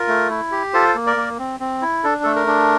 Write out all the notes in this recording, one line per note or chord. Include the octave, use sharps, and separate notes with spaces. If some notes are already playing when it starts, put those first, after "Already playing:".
Already playing: F4 A#4
A3
E4
G4
F4 A4 C5
A#3
A#4 D5
A#3
C4
C4
E4
D4 A4
A3 A4
A#4
D4